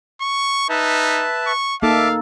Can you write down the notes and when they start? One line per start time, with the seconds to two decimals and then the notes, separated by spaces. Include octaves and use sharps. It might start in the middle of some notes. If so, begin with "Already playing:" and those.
0.21 C#6
0.69 D#4 B4 E5 A5
1.46 C#6
1.83 A#3 D#4 A4 E5 F5 A5 D6